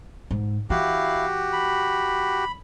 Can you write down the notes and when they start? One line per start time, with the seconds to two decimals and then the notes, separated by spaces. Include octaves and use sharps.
0.31 G#2
0.70 E3 E4 F#4 G4 F5
1.53 B5